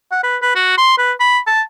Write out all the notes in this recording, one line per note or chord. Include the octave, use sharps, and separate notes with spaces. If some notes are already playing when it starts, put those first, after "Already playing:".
F#5
B4
B4
F#4
C6
B4
B5
A5